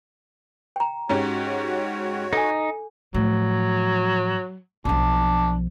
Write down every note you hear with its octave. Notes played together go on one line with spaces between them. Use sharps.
G5 A#5
G#2 C#4 F#4 G4 C#5 A#5
D#4 A4 G#5
A2 F3 F#3
B1 F3 D4